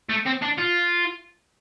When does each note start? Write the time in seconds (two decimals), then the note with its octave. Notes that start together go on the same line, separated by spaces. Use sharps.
0.10 A3
0.26 C4
0.42 D4
0.58 F4